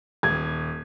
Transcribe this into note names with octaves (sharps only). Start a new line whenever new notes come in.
D#1 G#6